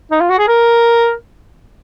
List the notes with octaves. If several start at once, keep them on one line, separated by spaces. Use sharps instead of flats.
D#4
F4
F#4
G#4
A#4